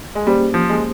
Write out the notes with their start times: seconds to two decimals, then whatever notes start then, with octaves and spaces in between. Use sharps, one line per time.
0.15 G#3
0.27 G3 A#3 C#4 G4 C5
0.54 F3
0.70 G#3